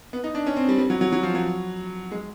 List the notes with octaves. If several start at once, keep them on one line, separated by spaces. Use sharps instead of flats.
B3
D#4
D4
C#4
C4
G3
G3
F#3
F#3
F#3
F3
F#3
G#3